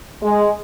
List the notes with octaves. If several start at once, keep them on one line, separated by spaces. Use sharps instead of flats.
G#3